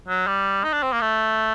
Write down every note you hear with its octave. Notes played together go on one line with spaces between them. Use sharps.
F#3
G3
D#4
D4
C4
A#3
A3